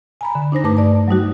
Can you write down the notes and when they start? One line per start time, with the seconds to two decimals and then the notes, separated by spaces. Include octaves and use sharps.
0.21 G#5 A#5 B5
0.35 D3
0.52 D4 D#4 C5 A#6
0.64 G2 A3 B4 A5 D6
0.77 D5 A5
1.08 F#3 G3 D#4 F#4